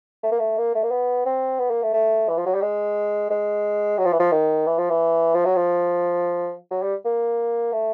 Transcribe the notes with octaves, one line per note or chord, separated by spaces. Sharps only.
A3
A#3
A3
A#3
A3
A#3
B3
C4
B3
A#3
A3
A3
E3
F3
F#3
G3
G#3
G#3
F#3
F3
E3
F3
D#3
E3
F3
E3
F3
F#3
F3
F#3
G3
A#3
A3